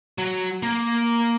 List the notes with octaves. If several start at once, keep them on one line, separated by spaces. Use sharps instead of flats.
F#3
A#3